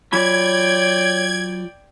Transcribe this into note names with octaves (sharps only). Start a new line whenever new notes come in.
F#3 F4 C#5 D5 G5 B5 G#6